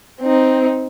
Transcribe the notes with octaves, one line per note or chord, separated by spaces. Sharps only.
C4 D#4